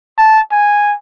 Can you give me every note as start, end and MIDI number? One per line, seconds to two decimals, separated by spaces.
0.18 0.40 81
0.52 0.94 80